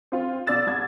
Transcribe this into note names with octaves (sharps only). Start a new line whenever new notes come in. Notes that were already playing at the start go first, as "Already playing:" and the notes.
C4 F4
B2 D5 E6 A6 E7
C2 G#6